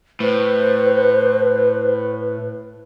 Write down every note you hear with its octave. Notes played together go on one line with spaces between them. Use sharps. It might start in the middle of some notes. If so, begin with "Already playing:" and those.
A2 B4 C5